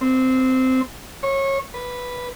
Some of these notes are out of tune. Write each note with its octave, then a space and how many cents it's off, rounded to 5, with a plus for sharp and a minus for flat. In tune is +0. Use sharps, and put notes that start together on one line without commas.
C4 -15
C#5 -25
B4 -5